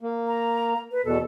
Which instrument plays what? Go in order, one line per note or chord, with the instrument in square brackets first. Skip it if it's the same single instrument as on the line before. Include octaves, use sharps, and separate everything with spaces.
[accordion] A#3
[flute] A#5
B4
[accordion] E2 B2 [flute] A4